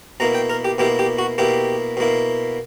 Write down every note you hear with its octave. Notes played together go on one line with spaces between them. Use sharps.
B2 A#3 E4 A#5
G5
A#4
G4
B2 A#3 E4 G4
G4
F#4
B2 A#3 E4 G4
B2 A#3 E4